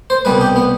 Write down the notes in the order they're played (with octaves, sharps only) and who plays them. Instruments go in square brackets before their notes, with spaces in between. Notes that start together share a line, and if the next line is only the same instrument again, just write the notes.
[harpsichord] C5
C2 B2 G3 B4
G4
B3